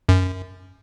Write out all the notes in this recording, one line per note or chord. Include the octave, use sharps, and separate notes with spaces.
F#2